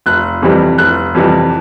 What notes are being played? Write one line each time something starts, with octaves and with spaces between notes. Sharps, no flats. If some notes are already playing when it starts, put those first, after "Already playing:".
F1 F#6
F2 C3 E3 G3
F1 F#6
F2 C3 E3 G3